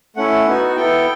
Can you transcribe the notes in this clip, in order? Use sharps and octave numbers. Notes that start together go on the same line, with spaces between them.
A3 C#4 E4 F#5
B3 D#4 F#4
B3 E4 A4 G5